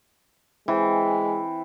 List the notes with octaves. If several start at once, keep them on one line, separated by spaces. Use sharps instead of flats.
E3 G#3 C4